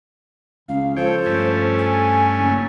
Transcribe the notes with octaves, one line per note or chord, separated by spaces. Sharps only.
C#2 C#3 F5
F3 A4 C5 C#5 G5
G2 A3 C#4
G#5
F#1 F#3